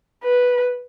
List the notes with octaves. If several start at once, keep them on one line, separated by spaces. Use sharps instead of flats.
B4